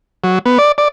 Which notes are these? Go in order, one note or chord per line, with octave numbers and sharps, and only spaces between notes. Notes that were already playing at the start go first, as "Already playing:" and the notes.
F#3
B3
D5
D5